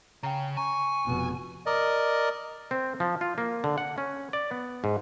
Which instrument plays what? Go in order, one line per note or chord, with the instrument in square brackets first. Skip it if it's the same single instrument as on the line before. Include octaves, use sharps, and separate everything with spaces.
[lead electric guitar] C#3 [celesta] G5 A#5
[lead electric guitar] G#5 [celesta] A#5 [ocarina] C#6
[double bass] F1 B2
[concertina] A#4 D5 D#5
[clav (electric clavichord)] C4
F3
F4
A#3
D3
F#5
C#4
D5
B3
G#2